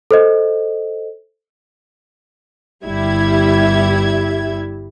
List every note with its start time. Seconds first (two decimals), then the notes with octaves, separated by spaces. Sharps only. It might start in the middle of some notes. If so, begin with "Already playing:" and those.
0.11 A4 C5 D#5
2.86 G1 G3 E4 G4 E5 G#6